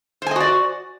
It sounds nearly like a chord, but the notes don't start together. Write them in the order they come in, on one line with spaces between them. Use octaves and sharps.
C5 G#5 D#5 F#4 D5